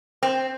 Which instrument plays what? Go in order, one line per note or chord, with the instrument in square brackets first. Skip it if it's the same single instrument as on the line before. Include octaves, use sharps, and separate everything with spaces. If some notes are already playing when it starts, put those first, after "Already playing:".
[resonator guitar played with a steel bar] C4